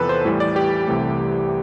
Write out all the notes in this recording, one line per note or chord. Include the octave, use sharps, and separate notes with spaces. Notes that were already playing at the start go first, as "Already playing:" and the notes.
Already playing: E2 C3 F3 A4 B4
C5
A2 E3 G3
D5
G4
C2 C3 E3 A3